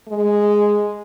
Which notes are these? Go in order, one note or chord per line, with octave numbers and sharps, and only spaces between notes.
G#3